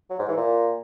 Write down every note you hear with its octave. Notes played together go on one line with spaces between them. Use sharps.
F#3
G#2
E3
A#2